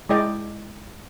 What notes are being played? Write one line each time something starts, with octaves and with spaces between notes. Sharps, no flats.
G#3 E4 D5 D#5 G5